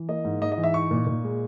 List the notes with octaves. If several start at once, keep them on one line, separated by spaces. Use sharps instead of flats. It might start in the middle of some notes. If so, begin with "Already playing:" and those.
Already playing: E3
A#3 D#5
G#2
G#2 D#5
D#5
E3
E5
D#4 C#6
A#2
A#2
G#3